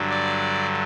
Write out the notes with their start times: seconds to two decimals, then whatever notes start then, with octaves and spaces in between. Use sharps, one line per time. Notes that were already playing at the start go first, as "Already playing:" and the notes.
Already playing: G2 D3 F#3
0.11 D5